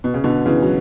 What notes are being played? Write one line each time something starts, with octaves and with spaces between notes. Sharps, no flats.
B2
C#3
B2 D3
C#3 E3
F#3